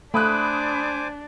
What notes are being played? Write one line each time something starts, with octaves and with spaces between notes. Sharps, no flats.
A3 D4 C5 G#5 B5 D6 D#6 F#6